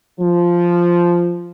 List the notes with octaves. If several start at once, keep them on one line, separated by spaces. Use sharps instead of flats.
F3